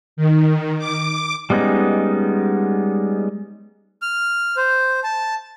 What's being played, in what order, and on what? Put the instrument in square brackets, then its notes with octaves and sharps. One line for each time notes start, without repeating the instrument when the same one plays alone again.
[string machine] D#3
D6
[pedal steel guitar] G3 G#3 B3 C#4 D#4
[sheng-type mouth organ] F6
C5
A5